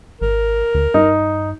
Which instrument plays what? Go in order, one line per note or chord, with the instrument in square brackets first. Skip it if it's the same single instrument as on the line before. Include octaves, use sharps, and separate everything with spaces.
[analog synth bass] G#1 [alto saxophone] A#4
[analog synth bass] D2
[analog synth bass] G2 [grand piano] D#4